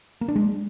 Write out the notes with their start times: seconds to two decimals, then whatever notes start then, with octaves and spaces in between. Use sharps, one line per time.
0.21 A#3
0.28 D4
0.36 G#3